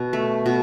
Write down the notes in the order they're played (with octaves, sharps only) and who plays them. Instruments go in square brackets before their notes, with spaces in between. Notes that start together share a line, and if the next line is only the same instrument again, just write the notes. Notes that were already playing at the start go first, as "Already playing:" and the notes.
Already playing: [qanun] B2
A3
B2